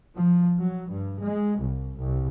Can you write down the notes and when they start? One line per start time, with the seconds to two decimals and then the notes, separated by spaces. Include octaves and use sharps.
0.17 F3
0.57 F#3
0.89 G2
1.21 G#3
1.58 C2
1.96 C2